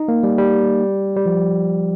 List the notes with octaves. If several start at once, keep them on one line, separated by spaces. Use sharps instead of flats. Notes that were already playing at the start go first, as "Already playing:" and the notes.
Already playing: D#4
A#3
G3
G3
G3
F3